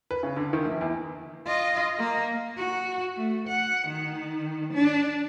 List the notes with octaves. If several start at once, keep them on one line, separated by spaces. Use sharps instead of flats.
B4
C#3
D3
D#3
A#1
E2
F4 D#5
A#3
F#4
A3
F#5
D#3
D4